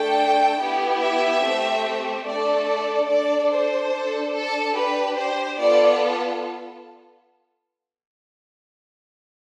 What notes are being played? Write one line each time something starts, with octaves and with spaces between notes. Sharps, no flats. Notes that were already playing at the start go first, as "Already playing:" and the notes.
Already playing: A3 D4 A4 G5
B3 E4 G4
E5
A3 C4 G4
A3 D4 A4 D5
D5
D4 A4 D5
C5
D4 A4
A4
D4 G4 B4
C5
B3 F4 A4 D5